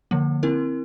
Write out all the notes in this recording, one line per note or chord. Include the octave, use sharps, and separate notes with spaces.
D3 F3 A#3
C4 E4 A#4